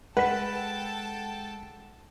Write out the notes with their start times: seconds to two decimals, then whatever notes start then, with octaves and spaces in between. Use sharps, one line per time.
0.17 G#3 A4 B4 F#5 G5 A5 B6